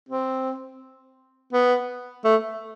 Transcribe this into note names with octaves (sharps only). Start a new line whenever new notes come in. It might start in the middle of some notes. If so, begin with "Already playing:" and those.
C4
B3
A3